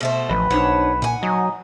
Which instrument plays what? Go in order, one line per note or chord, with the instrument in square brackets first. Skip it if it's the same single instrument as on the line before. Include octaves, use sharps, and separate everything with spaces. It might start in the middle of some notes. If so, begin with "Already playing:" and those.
[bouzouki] B2 A3 C5
[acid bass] A1 [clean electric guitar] F3 D#5 [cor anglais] B4
[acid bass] B1 [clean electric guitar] D4 D#4 C5 [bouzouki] C#5 F#5 A5
[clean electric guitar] A#2 [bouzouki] F#5 G#5
[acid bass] F#3 [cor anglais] D#4 [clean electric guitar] D#5